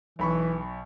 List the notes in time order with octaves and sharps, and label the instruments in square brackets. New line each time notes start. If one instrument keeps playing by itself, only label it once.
[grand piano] B1 B5 C#6 [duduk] E3